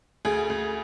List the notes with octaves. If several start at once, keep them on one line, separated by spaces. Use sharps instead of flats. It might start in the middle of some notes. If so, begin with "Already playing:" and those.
D2 G#4
D2